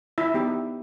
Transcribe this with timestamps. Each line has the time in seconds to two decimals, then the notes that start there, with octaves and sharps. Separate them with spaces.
0.18 E4 E5
0.34 B3 D#4 G4